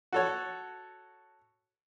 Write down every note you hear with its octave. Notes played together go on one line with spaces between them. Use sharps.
F#4 A4 C#5